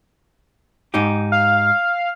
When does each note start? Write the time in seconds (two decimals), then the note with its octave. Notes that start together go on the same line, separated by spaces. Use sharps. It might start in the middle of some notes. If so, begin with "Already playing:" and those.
0.94 G#2 D#4 G4
1.32 F5